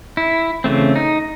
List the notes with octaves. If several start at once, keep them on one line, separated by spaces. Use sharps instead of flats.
E4
C#3 E3 A3 C4
D#4